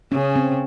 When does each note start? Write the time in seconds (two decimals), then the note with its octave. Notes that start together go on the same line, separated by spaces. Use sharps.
0.12 C#3 C#4
0.36 C4